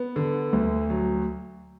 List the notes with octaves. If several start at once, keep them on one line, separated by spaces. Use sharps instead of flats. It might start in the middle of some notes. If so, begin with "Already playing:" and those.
Already playing: B3
D3
D2
F#3